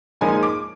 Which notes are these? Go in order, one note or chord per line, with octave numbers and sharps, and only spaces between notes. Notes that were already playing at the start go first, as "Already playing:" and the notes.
A#2 F3 G#3 D#4 G#5
D6